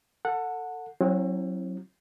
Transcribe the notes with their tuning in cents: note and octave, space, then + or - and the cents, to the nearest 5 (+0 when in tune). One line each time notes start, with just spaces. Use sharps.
A4 +25 F#5 -15
F#3 +0 C4 +35 E4 +0